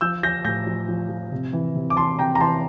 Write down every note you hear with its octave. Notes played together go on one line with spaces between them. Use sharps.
F3 E6 G6
F3 G6 A#6
A2 G6 A#6
F3
F3
F3
C3
E3
C3
D6
E3 A5 C6
C3 G5 A#5
A#5
E3 A5 C6